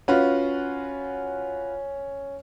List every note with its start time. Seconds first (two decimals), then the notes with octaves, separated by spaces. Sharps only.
0.08 C#4 F4 F#4 B4